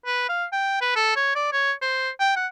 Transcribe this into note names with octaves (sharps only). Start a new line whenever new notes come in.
B4
F5
G5
B4
A4
C#5
D5
C#5
C5
G5
F#5